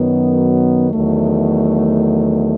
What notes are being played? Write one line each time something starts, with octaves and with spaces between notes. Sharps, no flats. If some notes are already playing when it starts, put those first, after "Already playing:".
Already playing: F#2 D#3 F#3 B3
E2 D#3 F#3 A3